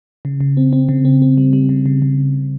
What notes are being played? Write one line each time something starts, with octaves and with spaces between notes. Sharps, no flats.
C#3
C#3
C4
C4
C#3
C4
C4
G3
G3
C#3
C#3
C#3